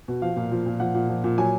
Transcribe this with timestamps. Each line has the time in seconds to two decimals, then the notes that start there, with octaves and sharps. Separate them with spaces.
0.08 B2
0.22 F3 F5
0.36 A#2
0.51 F3
0.66 A#2
0.80 F3 F#5
0.94 A#2
1.09 F3
1.24 A#2
1.38 F#3 G#5